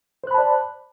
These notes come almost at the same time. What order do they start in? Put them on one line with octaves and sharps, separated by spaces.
C5 F#6 B5 A5 D5